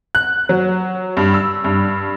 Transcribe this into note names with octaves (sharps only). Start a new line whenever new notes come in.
F#6
F#3
G2
E6
G2